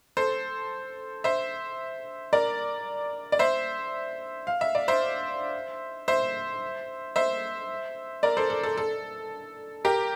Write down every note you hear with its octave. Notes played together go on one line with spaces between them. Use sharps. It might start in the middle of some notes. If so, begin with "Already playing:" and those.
A4 C5
C5 E5
A#4 D5
D5
C5 E5
F5
E5
D5
C5 E5
C5 E5
C5 E5
A#4 D5
A4 C5
A4
A4
A4
G4 A#4